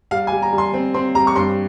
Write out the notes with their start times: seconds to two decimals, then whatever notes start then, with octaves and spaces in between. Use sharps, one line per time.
0.11 G3 F5
0.27 G#5
0.32 G3
0.42 A#5
0.52 G3
0.58 C6
0.74 C4
0.94 C4 C6
1.15 G3 A#5
1.27 C#6
1.36 G2 C6